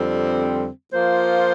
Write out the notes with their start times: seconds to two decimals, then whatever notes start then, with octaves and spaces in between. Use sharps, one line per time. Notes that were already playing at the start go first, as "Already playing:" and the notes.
Already playing: F2 D3 G3 C4
0.93 F3 A#3 F4 C5